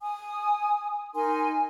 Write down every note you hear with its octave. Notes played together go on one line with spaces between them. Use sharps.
G#5 D#6
D#4 A#4 G#5 C6